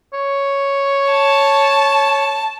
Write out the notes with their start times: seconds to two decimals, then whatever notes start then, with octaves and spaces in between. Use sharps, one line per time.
0.13 C#5
1.12 A5